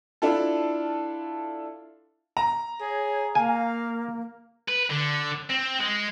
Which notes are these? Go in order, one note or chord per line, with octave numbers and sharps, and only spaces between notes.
D4 E4 F4 A4
A#5
G#4 C#5
A#3 F5 G#5
B4
D3
C4
G#3